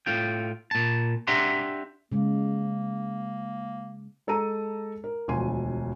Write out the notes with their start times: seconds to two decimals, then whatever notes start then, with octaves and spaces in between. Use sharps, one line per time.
0.06 A2 F4 G5
0.71 A#2 A5
1.27 D4 G4 E5 F#5 A#5 C6
2.12 C#3 G#3 A#3
4.27 G#3 A4 A5 A#5 D#7
5.04 A#4
5.28 E1 D2 F3 G#5 C6 D#7